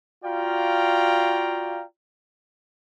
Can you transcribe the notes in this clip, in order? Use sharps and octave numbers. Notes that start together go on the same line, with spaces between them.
F4 F#4 D5 F5 G5 A#5